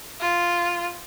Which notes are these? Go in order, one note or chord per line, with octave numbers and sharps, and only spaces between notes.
F4